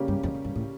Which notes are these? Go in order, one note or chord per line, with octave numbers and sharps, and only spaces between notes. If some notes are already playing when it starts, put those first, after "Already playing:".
Already playing: C#3 G3 A#3 C#4 G4
G2
F2
F2
G2
A2